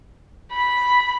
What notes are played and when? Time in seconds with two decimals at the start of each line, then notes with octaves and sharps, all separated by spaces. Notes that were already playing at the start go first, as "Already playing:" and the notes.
0.52 B5